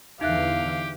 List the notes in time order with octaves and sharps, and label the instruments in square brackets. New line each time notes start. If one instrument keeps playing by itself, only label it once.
[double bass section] E2 D3 E3 [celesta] D#4 E5 F#6 [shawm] G4 [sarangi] F5